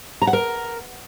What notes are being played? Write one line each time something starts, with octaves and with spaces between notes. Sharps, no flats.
A#5
F#5
A#4